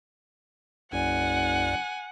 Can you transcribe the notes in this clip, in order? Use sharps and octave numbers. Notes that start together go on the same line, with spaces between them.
F#1 B1 F#2 D5 F#5 G#5